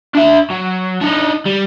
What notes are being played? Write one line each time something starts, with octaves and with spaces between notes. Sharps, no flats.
D4 E5
F#3
D4 D#4
G3